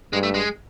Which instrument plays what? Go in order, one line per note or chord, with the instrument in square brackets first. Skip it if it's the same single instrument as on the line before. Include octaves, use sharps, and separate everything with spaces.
[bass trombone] G2 [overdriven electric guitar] G#3
[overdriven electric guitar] A3
G#3